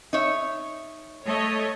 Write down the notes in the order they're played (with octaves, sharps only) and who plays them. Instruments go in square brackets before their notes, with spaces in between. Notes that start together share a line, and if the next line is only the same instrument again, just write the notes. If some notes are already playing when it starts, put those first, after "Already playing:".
[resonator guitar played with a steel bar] D#4 C#5 E5
[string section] A3 C#5 D#5